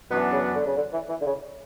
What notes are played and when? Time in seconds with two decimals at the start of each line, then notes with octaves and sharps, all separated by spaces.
0.10 F#2 B2 E3 B3 D4 F#4
0.32 C#3
0.55 D3
0.66 C#3
0.76 D3
0.93 E3
1.09 E3
1.21 D3
1.26 C#3